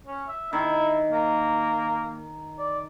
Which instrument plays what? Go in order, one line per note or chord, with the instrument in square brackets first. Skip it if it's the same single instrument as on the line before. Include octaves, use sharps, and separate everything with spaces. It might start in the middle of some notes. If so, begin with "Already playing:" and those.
[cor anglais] C#4
E5
[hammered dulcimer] D#3 [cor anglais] E4
[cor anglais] A#3
D5